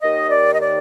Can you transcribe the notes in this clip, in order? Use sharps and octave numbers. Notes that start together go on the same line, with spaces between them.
D#2 D#3 D#5
D5
D#5
D5